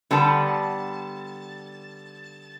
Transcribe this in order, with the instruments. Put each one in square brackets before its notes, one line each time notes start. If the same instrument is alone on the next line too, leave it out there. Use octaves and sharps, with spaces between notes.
[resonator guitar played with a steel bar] D3 G3 B3 A5